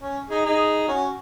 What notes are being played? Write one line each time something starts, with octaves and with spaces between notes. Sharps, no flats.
C#4
D#4 G#4
D#4 G#4
C#4 F#4